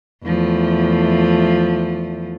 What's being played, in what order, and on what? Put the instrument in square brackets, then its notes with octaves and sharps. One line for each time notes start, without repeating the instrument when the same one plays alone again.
[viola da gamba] E2 F3 A3